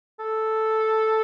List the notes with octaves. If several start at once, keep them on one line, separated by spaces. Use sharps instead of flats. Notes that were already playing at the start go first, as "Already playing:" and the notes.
A4